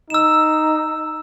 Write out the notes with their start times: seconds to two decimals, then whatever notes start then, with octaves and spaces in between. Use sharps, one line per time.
0.10 D#4 E6 E7